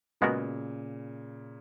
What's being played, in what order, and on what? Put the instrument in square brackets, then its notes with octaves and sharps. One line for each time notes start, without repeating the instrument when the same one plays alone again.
[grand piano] A#2 C#3 [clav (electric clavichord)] G#3 B3 F#4 A#4